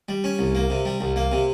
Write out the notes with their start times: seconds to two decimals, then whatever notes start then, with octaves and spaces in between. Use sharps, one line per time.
0.09 G3
0.24 C#4
0.39 C2
0.55 A#3
0.70 C3
0.85 G3
1.01 C2
1.16 A#3
1.32 C3